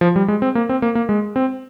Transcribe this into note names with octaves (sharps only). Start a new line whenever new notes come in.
F3
G3
G#3
C4
A#3
C4
A#3
A#3
G#3
C4